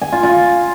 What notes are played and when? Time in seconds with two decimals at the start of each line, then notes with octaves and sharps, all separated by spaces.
0.02 G#5
0.12 F4
0.23 F4